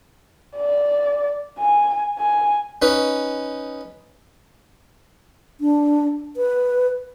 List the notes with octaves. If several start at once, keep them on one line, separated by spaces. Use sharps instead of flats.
D5
G#5
G#5
C#4 D#4 B4
D4
B4